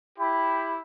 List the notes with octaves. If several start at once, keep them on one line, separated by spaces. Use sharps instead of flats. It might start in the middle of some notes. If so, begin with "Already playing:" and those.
E4 G4 B5